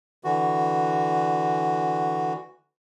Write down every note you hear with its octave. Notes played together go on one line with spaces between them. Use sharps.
D3 E3 F#4